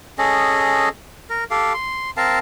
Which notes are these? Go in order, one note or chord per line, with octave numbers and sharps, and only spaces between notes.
C#4 G#4 A4 D#5
A#4
G4 A4 F5
C6
C4 A#4 F5 A5